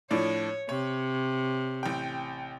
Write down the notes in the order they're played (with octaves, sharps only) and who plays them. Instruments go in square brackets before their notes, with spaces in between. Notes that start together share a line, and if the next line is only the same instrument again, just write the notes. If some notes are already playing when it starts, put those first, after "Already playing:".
[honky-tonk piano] A2 F3 D4 [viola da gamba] C#5
[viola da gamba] C3 [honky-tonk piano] C#5
[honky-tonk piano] A1 G5